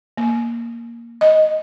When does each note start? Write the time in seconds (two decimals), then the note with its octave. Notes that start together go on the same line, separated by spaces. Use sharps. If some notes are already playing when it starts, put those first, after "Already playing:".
0.18 A#3
1.21 D#5